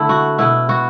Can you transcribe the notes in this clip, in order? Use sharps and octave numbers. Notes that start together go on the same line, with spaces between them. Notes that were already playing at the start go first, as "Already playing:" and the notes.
Already playing: D3 A3 E4
F#4
B2 B3 E4
F#4